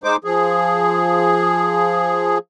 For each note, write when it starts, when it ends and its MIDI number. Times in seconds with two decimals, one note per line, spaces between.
0.04 0.16 56
0.04 0.16 63
0.04 0.16 72
0.04 0.16 86
0.24 2.38 53
0.24 2.38 68